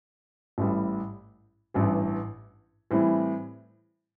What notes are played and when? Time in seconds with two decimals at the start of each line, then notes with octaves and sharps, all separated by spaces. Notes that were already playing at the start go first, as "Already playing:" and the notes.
0.58 A1 A2 G3
1.74 A1 G2 E3
2.91 A2 E3 G3 C4 E4